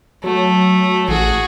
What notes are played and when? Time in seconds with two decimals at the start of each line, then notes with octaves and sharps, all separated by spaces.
0.24 F#3 A3
1.08 A1 F#4 G#4